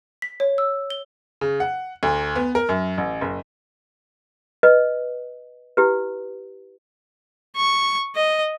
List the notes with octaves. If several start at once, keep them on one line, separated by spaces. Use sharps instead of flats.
B6
C#5
E6
G7
C#3
F#5
D2
B3
A#4
F#2
A1
F#1
B4 D#5
E4 G4 B4
C#6
D#5